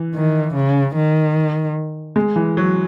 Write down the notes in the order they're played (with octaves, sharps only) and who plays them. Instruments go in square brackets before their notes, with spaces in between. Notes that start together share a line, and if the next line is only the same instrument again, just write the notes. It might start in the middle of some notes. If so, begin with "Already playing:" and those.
Already playing: [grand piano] E3
[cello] D#3
C#3
D#3
[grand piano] G#3
E3
F#3